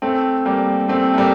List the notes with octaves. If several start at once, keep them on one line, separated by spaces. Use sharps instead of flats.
A3 C4
G3 A#3
A3 C4
A3
G3 A#3